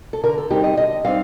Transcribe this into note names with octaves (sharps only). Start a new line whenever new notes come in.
A4
D3 A#4
A4
G3 C4 D#4 G4
D#5
D3 D#5
G3 C4 D#4 F5